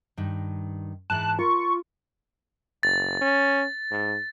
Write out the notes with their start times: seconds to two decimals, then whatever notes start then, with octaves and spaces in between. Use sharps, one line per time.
0.17 G2 D#3
1.10 G#2 E3 A5 F#6
1.39 F4 A#4 C#6
2.83 F#1 A6
3.21 C#4
3.91 G#2